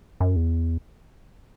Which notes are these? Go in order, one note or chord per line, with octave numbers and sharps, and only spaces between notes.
F#2
E2